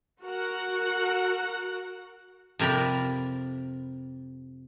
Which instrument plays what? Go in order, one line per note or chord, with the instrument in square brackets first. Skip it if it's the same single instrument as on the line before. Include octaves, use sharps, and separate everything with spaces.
[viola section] F#4 A#4 F#5
[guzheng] F2 C3 A#4 D5 B5